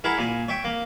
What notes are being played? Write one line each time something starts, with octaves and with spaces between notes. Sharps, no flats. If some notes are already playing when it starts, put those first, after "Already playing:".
E4 G#4 A#4 F#5 A5 B5
A#2 G#5
C#5 E5 G5
A#3